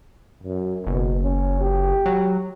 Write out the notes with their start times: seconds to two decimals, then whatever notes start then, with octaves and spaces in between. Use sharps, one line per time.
0.43 F#2
0.87 F#1 B2
1.23 C#4
1.61 G4
2.06 F#3